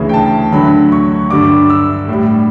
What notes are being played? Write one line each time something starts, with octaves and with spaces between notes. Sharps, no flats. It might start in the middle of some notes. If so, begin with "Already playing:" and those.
Already playing: D2 C#3 E3
G5
A5
D2 D3 F#3 B5
C#6
G2 D3 G3 D6
E6
A2 G3